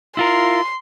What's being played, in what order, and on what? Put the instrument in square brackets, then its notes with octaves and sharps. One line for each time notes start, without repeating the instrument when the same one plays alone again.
[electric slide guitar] E4 F4 A#4 [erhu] C6